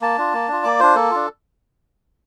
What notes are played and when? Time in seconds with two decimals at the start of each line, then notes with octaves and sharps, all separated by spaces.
0.01 A#3 A5
0.18 D4 F4
0.33 A#3
0.48 D4 F4
0.64 A#3 D5
0.79 D4 F4 C5
0.95 A#3 A4
1.11 D4 F4